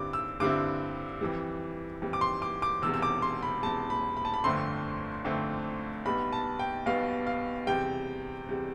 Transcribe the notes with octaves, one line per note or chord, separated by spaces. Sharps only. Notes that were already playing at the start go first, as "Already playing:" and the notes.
Already playing: G2 D3 G3 C4 E4 D6
E6
G2 D3 G3 C4 E4 D6
F2 E3 G3
F2 E3 G3
D6
C6
D6
D6
E1 E2 C3 E6
E6
D6
C6
B5
E1 E2 C3 A5
B5
B5
A5
B5
G1 F2 D3 A3 C4 C6
G1 F2 D3 A3 C4
B1 B2 G3 B3 B5
A5
G5
B1 B2 G3 B3 F5
F5
E2 C3 G3 G5
E2 C3 G3